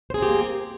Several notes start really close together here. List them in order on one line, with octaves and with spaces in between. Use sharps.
C5 G#4 C4 G4 A#3